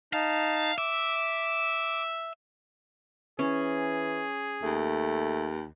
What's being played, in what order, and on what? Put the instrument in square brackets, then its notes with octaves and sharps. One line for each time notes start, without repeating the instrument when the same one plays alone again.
[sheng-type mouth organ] D#4 A5 [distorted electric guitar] F5
[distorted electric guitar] E5 [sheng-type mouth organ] D6
[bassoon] E3 [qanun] C#4 [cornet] G#4
[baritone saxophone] D#2 [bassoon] A3